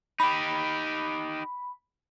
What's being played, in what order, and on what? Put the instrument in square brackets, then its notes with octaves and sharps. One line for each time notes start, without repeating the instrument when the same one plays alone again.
[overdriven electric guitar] D#4 G4 [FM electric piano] B5